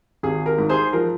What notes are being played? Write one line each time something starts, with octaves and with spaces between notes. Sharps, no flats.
G#1 G#4
A#4
G#2
G#4 C5
F3 A#4